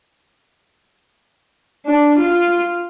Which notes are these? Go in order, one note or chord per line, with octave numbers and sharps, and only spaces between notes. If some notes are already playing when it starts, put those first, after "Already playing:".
D4
F4